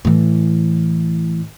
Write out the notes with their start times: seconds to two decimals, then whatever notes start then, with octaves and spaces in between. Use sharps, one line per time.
0.05 A2 E3